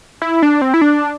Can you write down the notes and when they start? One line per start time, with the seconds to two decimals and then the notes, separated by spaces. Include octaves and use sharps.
0.22 E4
0.42 D4
0.61 C4
0.74 E4
0.81 D4